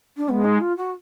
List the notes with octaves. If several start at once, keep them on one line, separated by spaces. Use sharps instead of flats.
D4
G#3 B3
D#4
F4
F#4